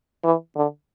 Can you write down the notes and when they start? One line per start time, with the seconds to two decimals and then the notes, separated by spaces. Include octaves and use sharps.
0.24 E3
0.56 D3